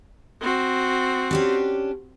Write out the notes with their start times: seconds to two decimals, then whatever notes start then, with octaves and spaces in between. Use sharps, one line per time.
0.41 C4 F#4
1.31 C#4 D4 G4